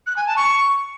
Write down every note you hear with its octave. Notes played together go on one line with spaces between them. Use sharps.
F#6
G#5
A5
C#6